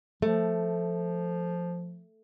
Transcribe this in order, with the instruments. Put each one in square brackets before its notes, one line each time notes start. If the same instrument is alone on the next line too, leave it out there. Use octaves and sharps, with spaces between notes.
[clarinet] F3 [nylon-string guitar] A3